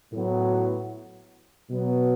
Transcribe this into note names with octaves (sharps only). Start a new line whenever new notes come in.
A2 F#3 B3
B2 F#3 B3